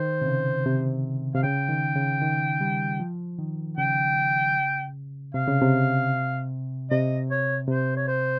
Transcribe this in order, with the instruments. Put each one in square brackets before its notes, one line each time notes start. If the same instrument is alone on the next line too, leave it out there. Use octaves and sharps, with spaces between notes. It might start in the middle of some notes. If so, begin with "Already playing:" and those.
Already playing: [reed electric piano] D#3 [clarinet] C5
[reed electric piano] C3
C#3
C3
[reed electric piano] C3 [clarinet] F5
[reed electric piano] C#3 [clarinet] G5
[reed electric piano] D#3
C#3
D#3
G3
F3
D#3
[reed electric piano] C#3 [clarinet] G5
[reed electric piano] C3 [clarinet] F5
[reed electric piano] C#3
C3
[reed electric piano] C3 [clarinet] D#5
[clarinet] C#5
[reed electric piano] C3 [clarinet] C5
[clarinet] C#5
C5